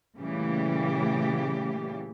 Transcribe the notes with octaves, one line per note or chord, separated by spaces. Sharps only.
A#2 C#3 E3 G3 A3 G4